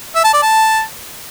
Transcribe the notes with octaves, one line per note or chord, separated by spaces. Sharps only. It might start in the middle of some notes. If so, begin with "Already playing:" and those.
E5
A5
D5
A5